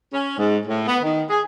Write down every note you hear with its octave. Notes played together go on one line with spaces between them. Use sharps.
C#4
G#2
A2
B3
D#3
G#4